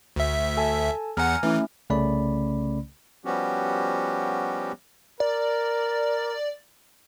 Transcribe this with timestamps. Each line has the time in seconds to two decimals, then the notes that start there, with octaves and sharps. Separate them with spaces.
0.16 D2 E5
0.57 A4 G#5 A5
1.17 E2 F#5 G#5 A#5 F6
1.43 E3 A3 C#4 E4
1.90 C2 C#3 A3 C#4 D5 B5
3.25 F3 G3 B3 C#4 F#4 G4
5.20 A#4 D5